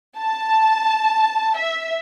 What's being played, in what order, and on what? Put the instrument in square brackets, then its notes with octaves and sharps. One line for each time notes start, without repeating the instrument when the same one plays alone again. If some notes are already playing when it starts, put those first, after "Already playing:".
[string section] A5
E5